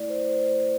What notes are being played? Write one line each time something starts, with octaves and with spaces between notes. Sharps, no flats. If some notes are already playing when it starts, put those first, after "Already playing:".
Already playing: A3 E4 D5
C5
C5